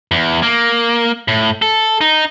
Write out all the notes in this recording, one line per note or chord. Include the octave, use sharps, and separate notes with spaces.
E2
A#3
A2
A4
D#4